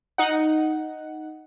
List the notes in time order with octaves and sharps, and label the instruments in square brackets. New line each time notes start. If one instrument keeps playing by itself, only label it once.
[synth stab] D#4 F#5